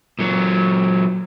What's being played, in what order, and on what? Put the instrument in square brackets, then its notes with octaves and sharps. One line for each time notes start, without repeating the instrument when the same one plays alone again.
[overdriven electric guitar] A#2 F#3